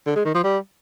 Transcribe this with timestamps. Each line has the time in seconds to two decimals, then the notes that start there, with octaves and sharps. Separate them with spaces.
0.06 D3
0.16 G#3
0.25 D#3
0.34 F3
0.44 G3